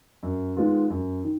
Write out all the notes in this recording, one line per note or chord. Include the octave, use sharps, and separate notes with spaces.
F#2
D#3 G#3 B3 F4
F#2
D#3